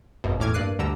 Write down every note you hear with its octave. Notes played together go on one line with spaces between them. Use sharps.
G#1 F#2 B2
E2 A2 D6 F6 G#6
G2 A#3 D5 F#6 C7 D#7
D2 D3 G3 A#5 E6